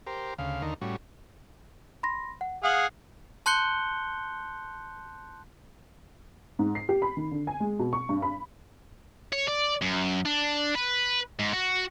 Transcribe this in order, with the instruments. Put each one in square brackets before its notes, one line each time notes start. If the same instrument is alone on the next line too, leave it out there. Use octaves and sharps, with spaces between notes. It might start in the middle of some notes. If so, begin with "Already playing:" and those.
[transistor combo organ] G4 A#4 C5
D2 C#3 F5
D#2 D3 D#4 A#4
A2 G3 C#4 F#4
[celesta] B5 C6 A#6
F#5
[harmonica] G#4 F5 F#5 [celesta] D#6 F#7
[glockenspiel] A5 C6 F#6 G6 C#7 G7
[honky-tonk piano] G#2
C7
G4
B5
D#3
D3
G#5
G#3
B2
C#6
G2
B5
[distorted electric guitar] C#5
D5
F#2
D4
B4
G#2
F#4